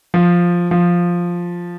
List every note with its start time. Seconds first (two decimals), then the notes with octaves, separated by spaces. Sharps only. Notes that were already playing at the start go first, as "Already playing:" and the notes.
0.14 F3
0.71 F3